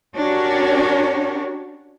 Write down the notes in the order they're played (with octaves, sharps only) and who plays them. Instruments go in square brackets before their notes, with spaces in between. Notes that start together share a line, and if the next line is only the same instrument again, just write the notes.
[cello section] C#4 D4 F#4 G4 A#4 C#5